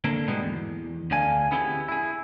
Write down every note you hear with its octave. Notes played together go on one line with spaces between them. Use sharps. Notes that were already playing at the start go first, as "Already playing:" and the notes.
D3 A#3 A4 A#4
G#2 B2 G3 G#3 B3
E2
D2 D3 D5 F5 G#5
B3 C#4 E4 G4 G#4
E4 G#4